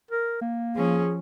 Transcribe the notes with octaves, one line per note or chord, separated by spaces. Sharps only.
A#4
A#3
F3 C#4 G#4